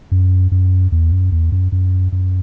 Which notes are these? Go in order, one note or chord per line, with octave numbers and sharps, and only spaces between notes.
F#2
F#2
E2
F#2
E2
F#2
F#2
F#2